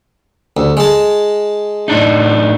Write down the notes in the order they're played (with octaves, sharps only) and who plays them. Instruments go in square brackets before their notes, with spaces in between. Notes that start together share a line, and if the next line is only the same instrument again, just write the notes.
[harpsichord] D2
G#3 A5
[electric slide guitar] A2 D4 D#4